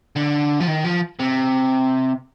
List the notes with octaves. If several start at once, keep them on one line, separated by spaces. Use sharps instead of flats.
D3
F3
D#3
F3
C3